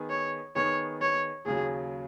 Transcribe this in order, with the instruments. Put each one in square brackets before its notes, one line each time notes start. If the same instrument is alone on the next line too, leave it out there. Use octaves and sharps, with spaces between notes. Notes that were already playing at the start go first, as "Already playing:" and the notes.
Already playing: [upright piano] D#3 B3 G#4
[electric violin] C#5
[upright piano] D#3 B3 G#4 [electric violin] C#5
[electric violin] C#5
[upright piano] D#2 C#3 F#3 [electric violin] G#4